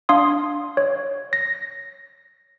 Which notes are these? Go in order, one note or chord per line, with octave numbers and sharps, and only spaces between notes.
D4 F5 C6 D#6
C#5
A#6